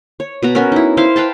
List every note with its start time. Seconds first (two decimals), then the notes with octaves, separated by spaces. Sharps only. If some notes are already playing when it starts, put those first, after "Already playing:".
0.20 C#5
0.43 B2 B3 A#5
0.55 B3 C#4 F#4 A#4
0.72 D#4 E4
0.97 E4 C5 F5
1.16 B4 F5 G5 A5